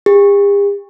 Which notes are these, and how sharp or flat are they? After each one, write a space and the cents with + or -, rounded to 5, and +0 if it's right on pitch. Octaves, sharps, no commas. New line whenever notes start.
G4 +45